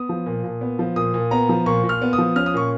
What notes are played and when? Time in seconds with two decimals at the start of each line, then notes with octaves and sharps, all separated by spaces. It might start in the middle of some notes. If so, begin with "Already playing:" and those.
Already playing: B3 D#6
0.09 F3
0.26 A#2
0.44 A#2
0.61 B3
0.79 F3
0.96 A#2 D#6
1.14 A#2
1.31 B3 A#5
1.49 F3
1.66 A#2 C#6
1.84 A#2
1.89 F6
2.01 B3
2.13 D#6
2.18 F3
2.36 C#4 F6
2.46 D#6
2.54 A#2 C#6